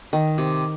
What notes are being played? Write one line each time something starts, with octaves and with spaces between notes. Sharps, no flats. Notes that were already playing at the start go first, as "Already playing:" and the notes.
D#3
C3